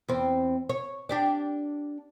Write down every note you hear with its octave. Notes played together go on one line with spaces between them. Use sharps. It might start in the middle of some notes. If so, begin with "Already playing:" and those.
E2 C4
C#5
D4 G4 D5